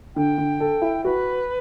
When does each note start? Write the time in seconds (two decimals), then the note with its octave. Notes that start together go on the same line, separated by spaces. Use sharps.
0.15 D3 G5
0.38 D3
0.60 A4
0.82 E4
1.04 F#4 B4